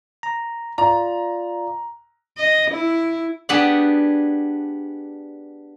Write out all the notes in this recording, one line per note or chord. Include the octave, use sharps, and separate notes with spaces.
A#5
F4 D5 A#5
D#5
E4
B3 D4 G4 G#4 D5 F#5